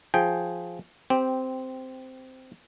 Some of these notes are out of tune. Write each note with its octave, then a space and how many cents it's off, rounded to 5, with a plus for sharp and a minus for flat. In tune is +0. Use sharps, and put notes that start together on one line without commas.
F3 +0 G#4 +0 G5 +0
C4 -10 G4 +0